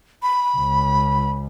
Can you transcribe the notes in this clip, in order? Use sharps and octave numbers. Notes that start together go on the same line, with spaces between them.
B5
C#2